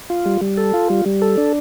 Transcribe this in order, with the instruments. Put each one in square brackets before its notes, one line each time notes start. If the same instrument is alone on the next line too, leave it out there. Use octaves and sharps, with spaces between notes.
[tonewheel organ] F4
G3
G3
A4
F4
G3
G3
A4
D4